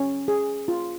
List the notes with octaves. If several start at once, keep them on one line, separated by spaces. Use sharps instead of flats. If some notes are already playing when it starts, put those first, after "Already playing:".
Already playing: C#4
G#4
F4